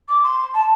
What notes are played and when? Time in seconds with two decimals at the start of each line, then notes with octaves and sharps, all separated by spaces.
0.08 D6
0.23 C6
0.54 A5